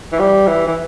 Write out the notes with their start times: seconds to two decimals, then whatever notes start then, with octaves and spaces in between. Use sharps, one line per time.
0.12 E3
0.19 G3
0.47 E3
0.67 E3